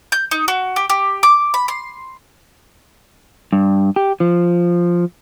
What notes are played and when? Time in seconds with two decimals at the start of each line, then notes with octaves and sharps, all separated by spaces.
0.12 G6
0.31 D#4
0.48 F#4
0.76 G4
0.90 G4
1.23 D6
1.54 B5
1.68 C6
3.53 G2
3.96 G4
4.20 F3